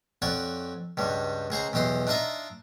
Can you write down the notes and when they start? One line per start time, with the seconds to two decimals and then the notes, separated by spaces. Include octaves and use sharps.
0.22 F2 F#4 C#5 D5
0.97 C#2 G2 G3
1.50 C#2 G#4 C5 A#5
1.73 B1 E2 G4 D#5 C6
2.07 D4 D#4 F4 D#5 E5 A#5